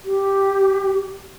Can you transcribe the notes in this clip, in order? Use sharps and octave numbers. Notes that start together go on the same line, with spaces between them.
G4